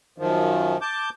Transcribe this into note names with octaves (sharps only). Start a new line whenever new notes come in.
F#2 D#3 F3
A5 D6 G6